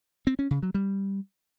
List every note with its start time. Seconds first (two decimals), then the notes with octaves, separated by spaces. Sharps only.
0.27 C4
0.39 C#4
0.51 C#3
0.63 F#3
0.74 G3